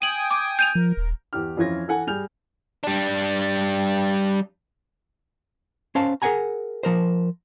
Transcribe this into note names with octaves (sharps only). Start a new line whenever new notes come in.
G5 G#5 D#6 D#7 F#7
D6
G6 D#7 F7
F3 A#4
D#1
E2 G4 F6
F2 E3 C#4 F4 G#6 A#6
E3 A4 F#5 G#5
G3 G#4 G#5 F6 G6 F7
G3 D4
C#4 C5 F5 A5
G#4 A#4 D#5 F#5 G#5 A#5
F3 A#4 C5